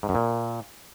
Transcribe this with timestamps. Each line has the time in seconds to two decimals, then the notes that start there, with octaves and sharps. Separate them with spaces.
0.03 G#2
0.09 F#2
0.15 A#2